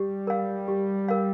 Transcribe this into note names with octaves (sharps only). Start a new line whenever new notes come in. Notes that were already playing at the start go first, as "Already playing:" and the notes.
Already playing: G3 G4
A#4 F5
G4
A#4 F5